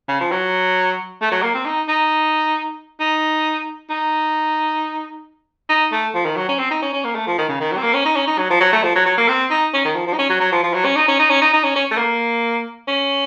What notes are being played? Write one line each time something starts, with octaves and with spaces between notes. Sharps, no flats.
C#3
F3
F#3
A3
F#3
A#3
C4
D#4
D#4
D#4
D#4
D#4
A3
F3
D#3
F#3
C#4
C4
D#4
C#4
C#4
A#3
A3
F3
D#3
C#3
D#3
F#3
C4
A#3
C#4
D#4
C#4
D#4
F#3
F3
F#3
A3
F3
F#3
F#3
A#3
C4
D#4
C#4
D#3
F3
F3
D#4
C#4
F#3
F#3
F3
F3
F#3
C#4
D#4
C#4
D#4
C#4
D#4
D#4
C#4
C#4
A3
A#3
C#4